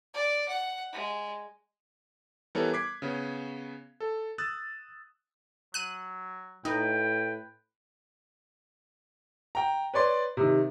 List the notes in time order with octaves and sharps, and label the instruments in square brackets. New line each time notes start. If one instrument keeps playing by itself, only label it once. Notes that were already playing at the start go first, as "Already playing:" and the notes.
[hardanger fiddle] D5
F#5
G#3
[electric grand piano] E3 G3 B3 A4 A#4 C#5
D6 F#6 G#6 B6 C7
C#3 B3 C#4
A4
D#6 E6 F#6 A6
[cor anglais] F#3 [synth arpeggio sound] F#6 D#7
[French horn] A2 [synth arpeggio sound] D#4 [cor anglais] B4 [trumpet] G5
[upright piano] G5 A#5
B4 C#5 D5 C6
C3 D#3